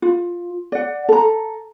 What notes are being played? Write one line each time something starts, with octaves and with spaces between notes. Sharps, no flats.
F4
D5 F#5
A4 A#5